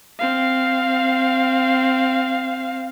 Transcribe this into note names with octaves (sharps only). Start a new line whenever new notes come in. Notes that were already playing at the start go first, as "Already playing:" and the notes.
C4 F5